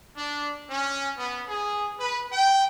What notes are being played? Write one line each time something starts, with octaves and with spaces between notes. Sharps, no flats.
D4
C#4
B3
G#4
B4
G5